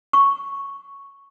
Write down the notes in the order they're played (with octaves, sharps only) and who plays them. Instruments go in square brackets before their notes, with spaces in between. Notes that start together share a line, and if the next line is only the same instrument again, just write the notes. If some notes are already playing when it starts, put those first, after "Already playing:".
[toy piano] C#6